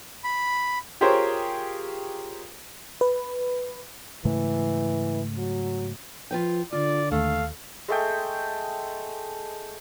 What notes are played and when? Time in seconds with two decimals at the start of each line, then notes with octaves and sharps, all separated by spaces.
0.24 B5
1.01 F4 G4 G#4 A#4 C5 C#5
3.01 B4
4.25 G#2 C#3 E3 A3
5.37 F#3
6.31 F3 F4 B4 G5
6.72 D3 F4 D5
7.12 D#2 A3 F5
7.88 G#3 A3 G5